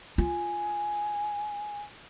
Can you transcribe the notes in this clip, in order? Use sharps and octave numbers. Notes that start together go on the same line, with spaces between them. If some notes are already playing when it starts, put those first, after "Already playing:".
F4 G#5